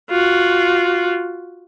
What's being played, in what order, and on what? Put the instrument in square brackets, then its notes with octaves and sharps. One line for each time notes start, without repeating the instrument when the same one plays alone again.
[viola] F4 F#4